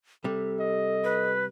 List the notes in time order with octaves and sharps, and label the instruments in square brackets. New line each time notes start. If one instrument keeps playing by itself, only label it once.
[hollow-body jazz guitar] C3 G3 [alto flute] A4
[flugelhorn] D#5
[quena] B4